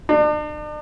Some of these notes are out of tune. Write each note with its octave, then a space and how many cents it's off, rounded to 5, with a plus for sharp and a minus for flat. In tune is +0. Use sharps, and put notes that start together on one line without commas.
D4 +40